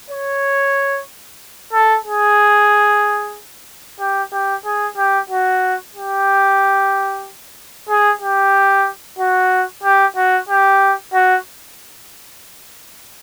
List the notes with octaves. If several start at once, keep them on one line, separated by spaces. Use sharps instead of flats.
C#5
A4
G#4
G4
G4
G#4
G4
F#4
G4
G#4
G4
F#4
G4
F#4
G4
F#4